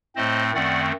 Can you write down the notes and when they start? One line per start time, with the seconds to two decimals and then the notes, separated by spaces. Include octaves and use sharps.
0.16 A2 A3 C4 C5 D#5
0.54 F#2 D#3 A3 C4 D5 F#5